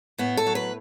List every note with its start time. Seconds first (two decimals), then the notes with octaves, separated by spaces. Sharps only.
0.18 A2 B3
0.37 A4
0.47 F#3
0.55 B4